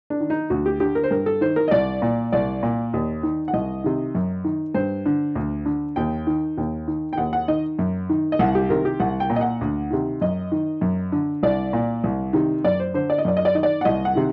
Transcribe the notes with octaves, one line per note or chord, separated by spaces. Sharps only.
D4
D#3
D#4
D2 F#4
G4
D3 G4
A#4
C5
G2 A#4
A4
D#3 C5
A#4
D#5
C2 D5
A#2
C2 D5
A#2
D#2
D#3
F#5
C2 D#5
C3 D#3
F#2
D#3
G2 C5
D3
D2
D3
D#2 G5
D#3
D#2
D#3
G5
D#2 F#5
F#5
D#3 D#5
F#2
D#3
D#5
C2 F#5
G4
C3 D#3 A#4
G4
C2 F#5
G5
A#2
D#5
F#5
D2
C3 D#3
F#2 D#5
D#3
F#2
D3
C2 D5
A#2
C2
C3 D#3
F#2 D5
C5
D3 C5
D5
D#5
F#2 D5
D#5
D5
D#3 D#5
D5
F#5
C2 D#5
F#5
C3 D#3